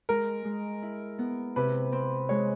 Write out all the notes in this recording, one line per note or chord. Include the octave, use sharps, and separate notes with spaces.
G#3 A#4
G#3
E4
B3
C3 B4
C4
G#3 C#5